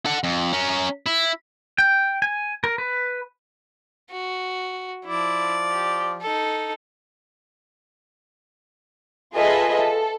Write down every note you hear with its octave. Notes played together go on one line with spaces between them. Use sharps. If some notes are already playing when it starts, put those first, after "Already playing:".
A4 F#5
F2
C#4 A#4
E4
G5
G#5
A#4
B4
F#4
F3 E4 D5
G4
D#4 A4
F4 G#4 A4 B4 D#5 E5
A4